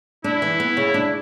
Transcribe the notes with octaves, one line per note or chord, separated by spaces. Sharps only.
D4 E4
E3
B3
C#3
D4